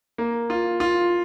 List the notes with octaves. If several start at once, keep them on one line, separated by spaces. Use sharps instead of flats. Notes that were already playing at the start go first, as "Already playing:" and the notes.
A#3
F4
F4